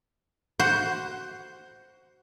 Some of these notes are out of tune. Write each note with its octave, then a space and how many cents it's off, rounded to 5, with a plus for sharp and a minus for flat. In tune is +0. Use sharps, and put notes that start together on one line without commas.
F#4 +15 C5 +0 F#5 +0